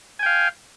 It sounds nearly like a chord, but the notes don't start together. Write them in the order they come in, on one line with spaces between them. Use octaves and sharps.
G#5 G5 F5